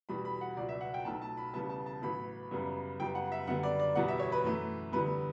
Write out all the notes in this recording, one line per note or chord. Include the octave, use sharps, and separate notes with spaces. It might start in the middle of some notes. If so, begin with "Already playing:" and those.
E2 B2 G3 B5
B5
F#5
C#2 B2 F#3 D5
E5
F#5
G5
B1 B2 A3 A5
A5
B5
E2 C#3 G3 B3 A5
A5
A5
A1 A2 F#3 B3 B5
F#2 C#3 G3 B3
F#2 C#3 G3 B3 G5
F#5
E5
F#2 D3 G3 B3 F#5
D5
D5
E2 B2 G3 B3 F#5
E5
C#5
B4
F#2 E3 A3
E2 D3 G3 B3 B4